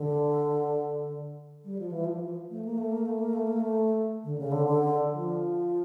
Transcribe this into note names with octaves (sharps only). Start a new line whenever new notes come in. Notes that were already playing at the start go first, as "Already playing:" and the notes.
Already playing: D3
G3
F3
E3
F3
A3
A#3
A3
A#3
A3
A#3
A3
A#3
A3
D3
C#3
D3
D3
F3